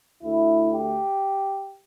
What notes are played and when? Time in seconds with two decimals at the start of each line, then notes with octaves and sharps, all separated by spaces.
0.23 D2 D3 A3 E4
0.72 G4